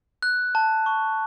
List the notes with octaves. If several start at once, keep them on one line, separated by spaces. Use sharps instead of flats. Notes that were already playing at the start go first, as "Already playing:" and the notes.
F#6
A5
C#6